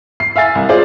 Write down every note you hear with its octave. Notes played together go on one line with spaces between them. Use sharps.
C7
E5 F5 G#5 A6
C2
F4 G#4 C5 D5